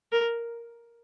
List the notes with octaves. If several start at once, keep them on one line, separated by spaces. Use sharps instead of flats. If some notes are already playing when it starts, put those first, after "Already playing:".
A#4